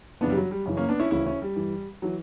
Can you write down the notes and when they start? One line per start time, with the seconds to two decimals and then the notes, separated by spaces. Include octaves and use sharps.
0.21 F#2 C#3 E3 B3 D4
0.30 G3
0.37 F#3
0.51 G3
0.66 F#2 C#3 E3
0.77 A#3 C#4
0.89 B3 D4
1.00 C#4 E4
1.11 D2 C#3 E3 C#4 E4
1.27 C#4 E4
1.42 G3
1.56 G2 E3
2.02 E3 F#3